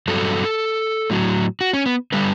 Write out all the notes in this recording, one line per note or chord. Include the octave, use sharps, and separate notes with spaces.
G2 F#3 A4
A2 F#3
F#4
C#4
B3
D3 G3 B4